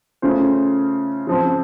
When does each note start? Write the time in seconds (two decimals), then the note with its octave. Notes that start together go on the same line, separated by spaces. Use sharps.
0.22 C#3 A3 C#4 F4 C5
1.27 C#3 F3 C4